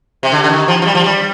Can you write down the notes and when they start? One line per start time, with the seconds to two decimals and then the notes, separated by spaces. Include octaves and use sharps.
0.23 C3
0.32 D3
0.44 D3
0.49 D#3
0.68 F3
0.82 F3
0.86 G3
0.95 F3
1.04 G3